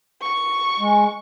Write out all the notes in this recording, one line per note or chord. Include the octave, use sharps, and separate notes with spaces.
C#6
G#3